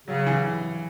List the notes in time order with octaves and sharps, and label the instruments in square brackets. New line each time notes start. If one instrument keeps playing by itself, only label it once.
[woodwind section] C#3 [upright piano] F#3
[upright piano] E3